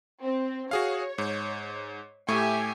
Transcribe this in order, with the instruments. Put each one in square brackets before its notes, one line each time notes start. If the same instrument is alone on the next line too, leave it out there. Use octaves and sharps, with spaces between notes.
[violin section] C4
[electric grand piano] F#4 G#4 F5 [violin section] C#5
[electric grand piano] G#2
[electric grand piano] A2 A3 C#6 [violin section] G4 E5 G#5